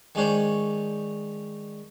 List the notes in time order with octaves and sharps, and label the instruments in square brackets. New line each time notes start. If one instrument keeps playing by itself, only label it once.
[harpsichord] D#3 G#3 C#4 D4 C5 C#5